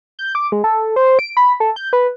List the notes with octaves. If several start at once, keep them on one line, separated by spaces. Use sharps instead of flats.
G6
D6
G#3
A4
C5
D7
B5
A4
G6
B4